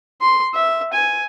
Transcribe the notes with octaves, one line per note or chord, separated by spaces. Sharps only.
C6
E5
G#5